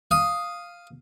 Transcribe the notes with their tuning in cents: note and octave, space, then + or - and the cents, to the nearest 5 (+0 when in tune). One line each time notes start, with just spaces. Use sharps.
F5 +0 D#6 +0